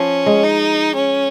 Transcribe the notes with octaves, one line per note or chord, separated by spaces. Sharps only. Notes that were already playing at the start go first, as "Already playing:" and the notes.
Already playing: F3 C#4
G#3
D#4
C#4